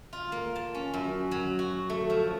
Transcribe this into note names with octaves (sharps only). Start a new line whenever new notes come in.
F4
A#3
A5
C#4
F#2
F#3
F#4
A3
F3